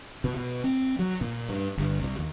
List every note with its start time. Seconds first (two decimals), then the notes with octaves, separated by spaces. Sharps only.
0.24 B2
0.36 B2
0.64 C4
0.99 F#3
1.21 A#2
1.49 G2
1.78 G1
2.00 C2
2.19 D#2